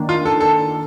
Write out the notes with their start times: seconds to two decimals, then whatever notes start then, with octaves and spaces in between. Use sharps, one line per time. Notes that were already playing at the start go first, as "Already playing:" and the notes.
Already playing: D#3 A#3 D4
0.09 F4
0.25 A4
0.40 A4